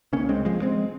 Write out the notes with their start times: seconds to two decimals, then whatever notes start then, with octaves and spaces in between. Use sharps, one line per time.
0.13 C#2 C#3 A#3 C#4
0.29 G#3 C4
0.45 F3 G#3
0.62 G#3 C4